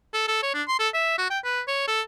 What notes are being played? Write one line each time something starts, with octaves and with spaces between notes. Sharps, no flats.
A4
A4
C#5
D4
C6
A4
E5
F#4
G5
B4
C#5
A4